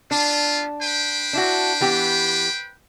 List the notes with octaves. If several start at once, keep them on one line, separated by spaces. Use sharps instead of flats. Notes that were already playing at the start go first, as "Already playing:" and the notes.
B3 D4 F4
B4 C5 G5
D4 E4 F#4
E3 B3 G4